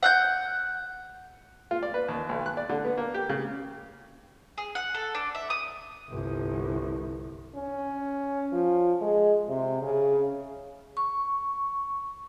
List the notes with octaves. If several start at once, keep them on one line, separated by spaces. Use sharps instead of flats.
F#5 F#6 G6
F4
D5
B4
D#2
B1
F#6
D5
D3
B3
A#3
G4
C#3
G#4
F#5
A4
D4
E5
D#6
G1 C2
C#4
F3
G#3
C3
C#3
C#6